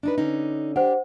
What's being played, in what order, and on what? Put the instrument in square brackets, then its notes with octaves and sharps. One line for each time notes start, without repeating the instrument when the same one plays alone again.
[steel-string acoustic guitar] D4 D#4 B4
D3 C#4 D#4
[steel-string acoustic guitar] D4 G4 [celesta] C5 F#5